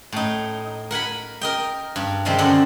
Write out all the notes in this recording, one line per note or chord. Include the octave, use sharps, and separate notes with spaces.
A2 D#4
A#4 F#5 G#5 B5
A#4 D#5 G5
G2
C3 D#3 G3 G#3 C4
F#2 D3 D4 A4 F#5